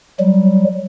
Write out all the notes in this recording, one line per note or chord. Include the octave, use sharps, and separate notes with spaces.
F#3 G3